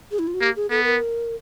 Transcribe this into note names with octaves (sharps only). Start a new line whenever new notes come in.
G#4
E4
F4
F#4
A#3 G4
G#4
B3 A4
A#4